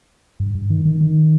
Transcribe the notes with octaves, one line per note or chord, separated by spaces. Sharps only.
G2
G2
D#3
D#3
D#3